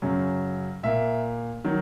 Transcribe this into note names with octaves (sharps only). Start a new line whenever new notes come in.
F#2 C#3 F#3
A#2 A#3 E5
D#3 F#3